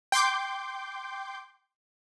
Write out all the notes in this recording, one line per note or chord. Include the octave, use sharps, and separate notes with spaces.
G5 C6 D6 G6